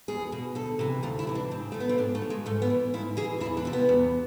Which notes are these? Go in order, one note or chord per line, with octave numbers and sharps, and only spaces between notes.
E2 G#4
B2
D2 A4
C3 E3
D2 F4
E4
C3 E3
D4
G#2 C4
F3 A3
B3
C4
G#2 D4
A3
F3
G#3
G#2 A3
B3
E3
G#2 E4
E3 G#4
E2 E4
D4
C3 F3
B3
E2